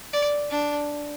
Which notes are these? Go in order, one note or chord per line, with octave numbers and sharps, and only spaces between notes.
D5
D4